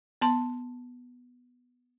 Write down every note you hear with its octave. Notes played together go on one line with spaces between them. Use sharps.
B3 A5 C6